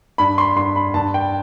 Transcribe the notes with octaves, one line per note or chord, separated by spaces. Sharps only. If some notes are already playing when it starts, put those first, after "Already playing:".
G2 B5
C6
G2 C6
B5
G2 A5
G5